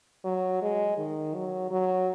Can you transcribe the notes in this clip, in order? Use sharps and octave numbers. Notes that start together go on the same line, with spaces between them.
F#3
G#3
D#3
F#3
F#3